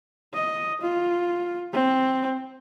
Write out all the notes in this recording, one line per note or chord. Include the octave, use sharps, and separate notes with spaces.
D#5
F4
C4